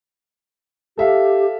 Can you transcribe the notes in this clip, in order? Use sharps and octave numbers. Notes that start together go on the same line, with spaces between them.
G4 A4 E5 F5